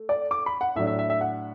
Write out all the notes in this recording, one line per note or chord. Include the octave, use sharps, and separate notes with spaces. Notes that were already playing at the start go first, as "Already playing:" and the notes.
Already playing: A3
D5
D6
B5
F#5
A2 F#3 D4 E5
E5
E5
E5
F#5